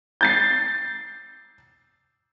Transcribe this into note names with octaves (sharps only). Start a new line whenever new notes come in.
G6 A6 C7